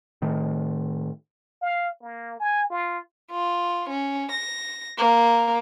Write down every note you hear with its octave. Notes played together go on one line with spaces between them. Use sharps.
A2 D#3 A3
F5
A#3
G#5
F4
F4
C#4
A#6
A#3